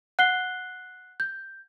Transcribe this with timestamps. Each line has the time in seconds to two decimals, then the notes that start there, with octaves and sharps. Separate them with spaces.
0.19 F#5 F#6 C7 G7
1.20 G6